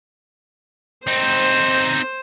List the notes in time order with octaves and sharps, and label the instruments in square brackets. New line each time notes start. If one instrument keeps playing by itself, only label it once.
[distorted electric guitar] C4 D#4 [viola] C5